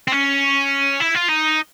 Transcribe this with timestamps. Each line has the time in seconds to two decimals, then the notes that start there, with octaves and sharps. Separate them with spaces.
0.08 C4
0.12 C#4
1.01 E4
1.15 F4
1.29 D#4